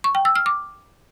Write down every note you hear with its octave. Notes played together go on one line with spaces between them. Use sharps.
C#6
G5
E6
F6
D6